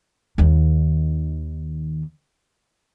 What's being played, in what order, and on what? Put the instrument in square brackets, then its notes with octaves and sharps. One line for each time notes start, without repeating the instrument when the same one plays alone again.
[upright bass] D#2 D#3